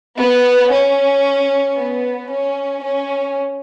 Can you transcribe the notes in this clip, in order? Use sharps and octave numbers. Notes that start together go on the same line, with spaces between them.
B3
C#4
B3
C#4
C#4